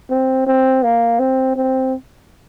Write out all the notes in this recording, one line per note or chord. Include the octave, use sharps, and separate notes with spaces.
C4
C4
A#3
C4
C4